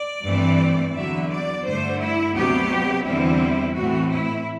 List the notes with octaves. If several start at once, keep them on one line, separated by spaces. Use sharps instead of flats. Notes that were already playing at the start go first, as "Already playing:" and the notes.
Already playing: D5
G2 E3 A3 C4
E2 D3 F#3 E5
D5
G2 D3 A3 C5
E4
D2 C3 F#3 B3 G4
E2 D3 G3 C4 E4
A2 E3 A3 C4 F#4
E4